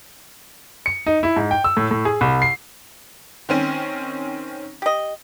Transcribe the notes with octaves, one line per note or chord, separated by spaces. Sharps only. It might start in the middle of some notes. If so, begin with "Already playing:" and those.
C#7
D#4
E4
G#2
G5
E6
A2
A2
G#4
C2
C7
D#3 C4 C#4
G4 D#5